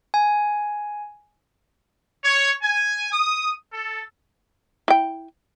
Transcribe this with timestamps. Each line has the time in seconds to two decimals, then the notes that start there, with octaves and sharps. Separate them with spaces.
0.14 G#5
2.24 C#5
2.63 G#5
3.12 D#6
3.72 A4
4.88 E4 G5